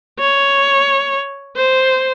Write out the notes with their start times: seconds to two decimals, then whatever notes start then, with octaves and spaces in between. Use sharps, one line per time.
0.19 C#5
1.56 C5